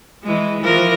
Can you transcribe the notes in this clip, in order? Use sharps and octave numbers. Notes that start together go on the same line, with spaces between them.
E3 G#3
E3 F3 A#4